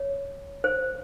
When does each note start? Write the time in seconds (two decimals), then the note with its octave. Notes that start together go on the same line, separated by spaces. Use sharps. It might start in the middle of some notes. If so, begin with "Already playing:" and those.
Already playing: C#5
0.64 C5